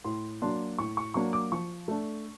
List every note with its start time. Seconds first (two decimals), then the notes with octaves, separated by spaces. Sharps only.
0.04 A2 C6
0.42 F#3 A#3 D4 C6
0.78 A2 C#6
0.97 C#6
1.14 F#3 A#3 D4 C#6
1.33 D6
1.52 F3 C#6
1.88 A3 D4